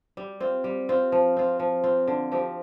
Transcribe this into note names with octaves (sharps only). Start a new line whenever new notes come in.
G3
C4 F4
G3
C4 F4
F3
C4 F4
F3
C4 F4
D3
F3 C4 G4